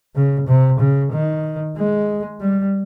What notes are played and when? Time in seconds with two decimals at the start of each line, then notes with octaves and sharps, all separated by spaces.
0.15 C#3
0.47 C3
0.79 C#3
1.13 D#3
1.77 G#3
2.41 G3